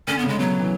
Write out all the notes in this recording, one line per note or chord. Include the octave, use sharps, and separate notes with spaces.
D3 C#4
B3
C#3
G#3
B2 F#3
E3